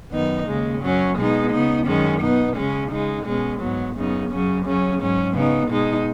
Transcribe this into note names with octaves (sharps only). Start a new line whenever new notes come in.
F#2 D#3 B3 D#4
D#2 C#3 G#3
F#2 F#3 C#4
B2 G#3 B3 D#4
C#3 B3 D#4
F#2 D#3 G#3 C#4
B2 B3 D#4
C#3 G#3 C#4
C#3 G#3 D#4
B2 G#3 C#4
G#2 F#3 B3
F#2 C#3 B3 D#4
F#2 C#3 F#3 C#4
C#3 F#3 C#4
G#2 F#3 C#4
C#3 B3 D#4
B2 G#3 D#4